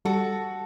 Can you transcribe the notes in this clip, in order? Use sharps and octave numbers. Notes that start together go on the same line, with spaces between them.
G3 F#4 A4